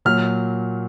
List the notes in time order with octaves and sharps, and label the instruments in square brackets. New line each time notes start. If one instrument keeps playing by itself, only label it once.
[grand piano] A#2 F#3 F6